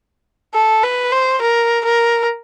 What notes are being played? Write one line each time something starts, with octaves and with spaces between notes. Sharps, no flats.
A4
B4
C5
A#4
A#4